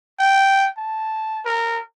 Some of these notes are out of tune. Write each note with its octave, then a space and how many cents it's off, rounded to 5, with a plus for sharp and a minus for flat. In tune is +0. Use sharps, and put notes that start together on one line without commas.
G5 -5
A5 -5
A#4 -15